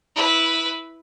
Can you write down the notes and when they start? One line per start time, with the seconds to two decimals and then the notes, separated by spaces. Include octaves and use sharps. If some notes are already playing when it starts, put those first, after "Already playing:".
0.15 E4 B4